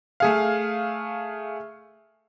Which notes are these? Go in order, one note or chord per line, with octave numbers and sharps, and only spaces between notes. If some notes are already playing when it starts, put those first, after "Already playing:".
A3 G#4 F5